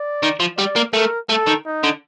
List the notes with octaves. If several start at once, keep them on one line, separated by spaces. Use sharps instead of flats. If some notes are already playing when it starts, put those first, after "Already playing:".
Already playing: D5
D#3
F3
G3 D5
A#3
A3 A#4
A3 A4
D#3
D#4
D3